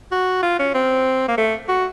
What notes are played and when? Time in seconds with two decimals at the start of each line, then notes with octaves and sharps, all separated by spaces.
0.12 F#4
0.43 F4
0.60 C#4
0.75 C4
1.28 A#3
1.38 A3
1.69 F#4